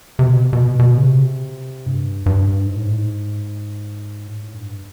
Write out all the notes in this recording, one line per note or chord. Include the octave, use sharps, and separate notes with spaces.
C3
B2
B2
B2
C#3
C3
G2
G2
G#2
A2
G#2
A2
G2